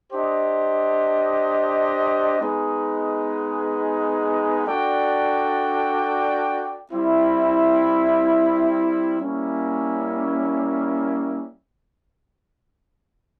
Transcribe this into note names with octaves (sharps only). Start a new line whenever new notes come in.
D4 G4 C5 D#5
G#3 B3 D#4 G#4 B4
D4 F#4 A4 D5 G5
G3 C4 E4
G3 A#3 C#4 E4